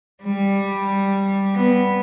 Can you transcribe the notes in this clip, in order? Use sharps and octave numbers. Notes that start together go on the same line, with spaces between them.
G3
B3